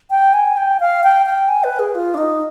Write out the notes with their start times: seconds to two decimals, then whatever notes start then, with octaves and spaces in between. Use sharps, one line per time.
0.10 G5
0.33 G#5
0.57 G5
0.80 F5
1.04 G5
1.26 G5
1.49 G#5
1.64 B4
1.79 G#4
1.95 F4
2.14 D4
2.18 D#4